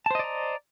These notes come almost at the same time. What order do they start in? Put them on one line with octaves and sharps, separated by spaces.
A5 C5 D#5 D5 A#5